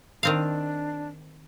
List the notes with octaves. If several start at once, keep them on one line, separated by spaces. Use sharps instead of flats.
D#3 C4 D4 F5